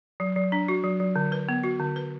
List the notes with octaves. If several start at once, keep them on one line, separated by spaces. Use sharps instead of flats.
F#3
F#3
D4
F#4
F#3
F#3
D3
B4
B3
F#4
D3
B4